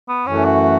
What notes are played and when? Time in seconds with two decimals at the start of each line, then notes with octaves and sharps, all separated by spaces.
0.08 B3
0.26 F#2 E3 A3 C#4
0.45 F#4